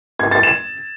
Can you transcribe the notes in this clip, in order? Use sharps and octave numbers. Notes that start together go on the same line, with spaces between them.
G#6
A6
E7